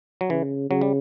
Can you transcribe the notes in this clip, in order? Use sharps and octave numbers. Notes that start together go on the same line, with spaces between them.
F#3
C#3 E3
C#3 F#3
G3